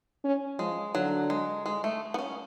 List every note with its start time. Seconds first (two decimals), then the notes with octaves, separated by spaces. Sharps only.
0.24 C#4
0.59 F3 G#3
0.95 D3 F#3
1.30 G#3
1.66 G#3
1.84 A3
2.14 B3
2.18 C#4